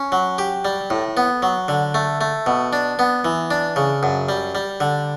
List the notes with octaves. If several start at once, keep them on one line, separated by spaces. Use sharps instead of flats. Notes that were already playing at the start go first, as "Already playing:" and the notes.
Already playing: C#4
F#3
G4
G3
A2
B3
F#3
D3
A3
A3
B2
D4
B3
E3
D4
C#3
F#2
G3
G3
D3